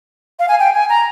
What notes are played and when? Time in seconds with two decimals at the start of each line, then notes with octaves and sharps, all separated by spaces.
0.39 F5
0.49 G#5
0.60 G5
0.74 G#5
0.89 A#5